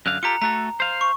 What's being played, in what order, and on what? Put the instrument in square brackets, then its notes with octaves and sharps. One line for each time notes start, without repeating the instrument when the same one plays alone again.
[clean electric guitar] F#2 D3 F5 [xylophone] F#6
[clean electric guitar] F4 G4 A4 [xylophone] A#5 C#7
[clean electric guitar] A3 F#4 A4 [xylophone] A#5
[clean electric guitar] C5 F5
[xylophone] C#6